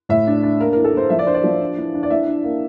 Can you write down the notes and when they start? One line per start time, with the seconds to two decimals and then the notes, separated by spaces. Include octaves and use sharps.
0.09 A2 E5
0.27 D4
0.43 D4
0.59 A#3 A#4
0.73 E3 A#4
0.84 A4
0.94 E3 C5
1.10 F3 E5
1.19 D5
1.27 D4 C5
1.34 D5
1.44 F3
1.60 D4
1.77 E3
1.94 D4
2.03 D5
2.10 E3 E5
2.27 D4
2.44 A#3